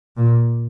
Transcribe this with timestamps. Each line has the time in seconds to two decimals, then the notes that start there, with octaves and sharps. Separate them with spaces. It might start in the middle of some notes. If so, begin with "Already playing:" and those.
0.17 A#2